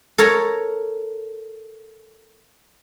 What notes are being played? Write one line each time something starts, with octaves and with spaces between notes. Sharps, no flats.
A4 A#4 C#5 A#5